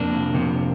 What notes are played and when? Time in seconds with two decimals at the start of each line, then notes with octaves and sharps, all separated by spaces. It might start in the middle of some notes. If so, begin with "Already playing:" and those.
Already playing: F2 C3 A#3 D4
0.34 F2 C3